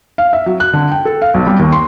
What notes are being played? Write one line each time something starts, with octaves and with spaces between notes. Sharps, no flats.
F5
E5
F#3
F#6
D3
G5
A4
F5
B1
G3
D#2
C6